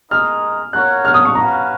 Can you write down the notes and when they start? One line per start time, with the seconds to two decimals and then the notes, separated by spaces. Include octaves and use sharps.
0.11 G#3 D#4 A#4 D#5 F6
0.73 F#4 A#4 C#5 F5 F#6
1.05 F6
1.14 D#6
1.25 C#6
1.35 C#4 F#4 B4 F5 A#5